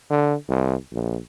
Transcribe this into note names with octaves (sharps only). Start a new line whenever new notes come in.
D3
C2
A#1